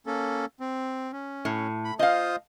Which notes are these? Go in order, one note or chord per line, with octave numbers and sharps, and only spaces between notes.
A#3 C#4 A4
C4
C#4
A2
B5
F4 C5 D#5 F5 D#6